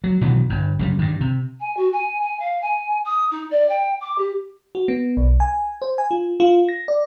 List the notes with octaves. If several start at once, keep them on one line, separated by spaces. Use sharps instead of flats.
F#3
B2 D#3 E3 F#3
G1 G2
F#2 C#3 G3
G2 D#3
C3
G#5
F#4
G#5
G#5
F5
G#5
D#6
D#4
D5
G5
D6
G4
F#4
B3
B1
G#5
C5
G#5
F4
F4
A#6
D5